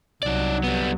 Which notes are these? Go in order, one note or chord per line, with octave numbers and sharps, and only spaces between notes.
C2 F#3 D#4 D5
G3 B3